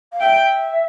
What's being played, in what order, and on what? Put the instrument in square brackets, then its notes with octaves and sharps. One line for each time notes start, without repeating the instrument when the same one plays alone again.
[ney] F5
[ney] E5 [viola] G5